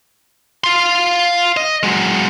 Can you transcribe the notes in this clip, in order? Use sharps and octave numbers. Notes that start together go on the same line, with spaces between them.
F5 C6
D#5
F#3 G#3